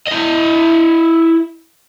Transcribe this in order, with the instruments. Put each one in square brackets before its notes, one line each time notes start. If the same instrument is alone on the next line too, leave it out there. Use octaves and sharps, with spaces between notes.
[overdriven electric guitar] E4 D#5